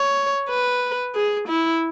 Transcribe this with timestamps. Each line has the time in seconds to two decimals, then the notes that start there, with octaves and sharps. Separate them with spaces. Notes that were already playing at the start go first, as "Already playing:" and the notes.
Already playing: C#5
0.50 B4
1.15 G#4
1.48 E4